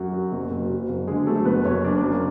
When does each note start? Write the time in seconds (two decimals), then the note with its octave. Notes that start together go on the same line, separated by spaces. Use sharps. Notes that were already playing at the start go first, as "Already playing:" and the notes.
Already playing: F#2 F#4
0.13 F#3
0.32 F#1
0.51 F#1
0.70 F#3
0.89 F#1
1.07 D3 G#3 G#4
1.26 F#3 A3 A4
1.45 F#1 B3 B4
1.65 F#1 C#4 C#5
1.84 F#2 D4 D5
2.03 F#2